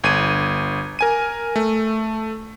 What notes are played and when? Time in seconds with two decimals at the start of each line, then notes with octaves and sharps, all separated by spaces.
0.04 G1 G#6 D#7
0.99 A#4 G#5 D#7
1.56 A3